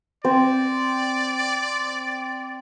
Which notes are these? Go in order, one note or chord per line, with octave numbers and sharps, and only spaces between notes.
C4 D5